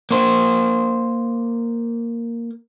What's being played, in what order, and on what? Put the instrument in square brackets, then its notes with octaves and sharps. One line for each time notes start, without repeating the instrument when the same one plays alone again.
[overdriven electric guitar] A#3 C5